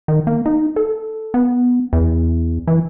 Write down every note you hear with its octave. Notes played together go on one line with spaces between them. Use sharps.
D#3
A#3
D#4
A4
B3
E2
E3